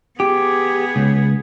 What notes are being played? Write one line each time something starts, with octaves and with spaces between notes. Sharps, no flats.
B3 G4 G#4
C#2